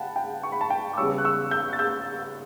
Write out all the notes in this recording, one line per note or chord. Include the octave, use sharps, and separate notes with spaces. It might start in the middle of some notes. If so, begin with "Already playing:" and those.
Already playing: C#3 F#5 G5 A5 B5
G5
C#6
B5
A5
G5
D6
E2 C#3 G3 C#4 C#6 E6
F#6
C#6 E6
E6 G6
A6
E6 G6